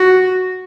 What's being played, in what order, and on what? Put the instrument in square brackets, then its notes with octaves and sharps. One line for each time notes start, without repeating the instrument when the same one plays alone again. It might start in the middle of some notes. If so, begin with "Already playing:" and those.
Already playing: [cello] F#4